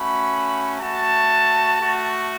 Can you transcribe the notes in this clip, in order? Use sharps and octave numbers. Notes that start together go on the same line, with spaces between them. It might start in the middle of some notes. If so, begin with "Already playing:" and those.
Already playing: A3 C#4 F#4 B5
A3 F#4 A5
A3 F#4